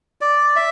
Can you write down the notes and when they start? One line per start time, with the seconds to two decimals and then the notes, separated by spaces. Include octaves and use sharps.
0.21 D5
0.56 E5